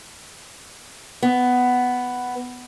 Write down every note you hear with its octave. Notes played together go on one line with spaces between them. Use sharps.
B3